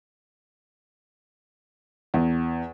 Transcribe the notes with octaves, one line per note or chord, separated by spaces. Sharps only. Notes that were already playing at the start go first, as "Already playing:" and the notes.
E2